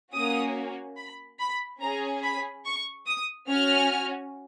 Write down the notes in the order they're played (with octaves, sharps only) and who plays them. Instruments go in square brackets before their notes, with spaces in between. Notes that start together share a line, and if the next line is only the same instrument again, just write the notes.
[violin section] A#3 C#4 F#4 D#6
B5
B5
C#4 G#4 A#5
B5
C#6
D#6
C#4 F#4 F6